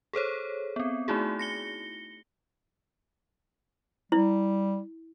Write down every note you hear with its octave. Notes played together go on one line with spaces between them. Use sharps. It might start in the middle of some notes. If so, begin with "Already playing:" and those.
G#4 A4 C5 C#5
B3 C4
A3 D#4 E4 F#4 G#4
A#6 C#7 G7
G3 E4